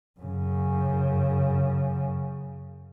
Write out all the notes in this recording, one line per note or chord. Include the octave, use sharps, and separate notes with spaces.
F#2 C#3